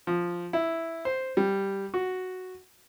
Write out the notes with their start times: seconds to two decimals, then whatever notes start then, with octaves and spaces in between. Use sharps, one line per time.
0.07 F3
0.53 E4
1.05 C5
1.37 G3
1.94 F#4